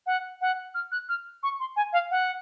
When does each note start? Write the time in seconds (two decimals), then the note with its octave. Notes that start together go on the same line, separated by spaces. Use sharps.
0.06 F#5
0.41 F#5
0.74 F6
0.92 F#6
1.09 F6
1.43 C#6
1.60 C6
1.76 G#5
1.93 F5
2.11 F#5